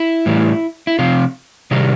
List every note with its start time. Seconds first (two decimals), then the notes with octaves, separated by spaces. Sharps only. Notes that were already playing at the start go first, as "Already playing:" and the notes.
Already playing: E4
0.26 A2 E3 G3
0.87 E4
0.99 C3 F3 F4
1.71 C3 D#3 G3 D#4